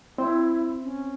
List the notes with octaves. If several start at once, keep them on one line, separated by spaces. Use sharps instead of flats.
C4 E4 C5
C#4